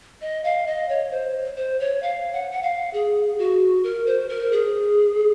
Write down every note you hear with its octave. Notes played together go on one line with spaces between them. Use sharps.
D#5
F5
D#5
C#5
C5
C5
C#5
F5
F#5
F#5
F5
G#4
F#4
A#4
C5
A#4
G#4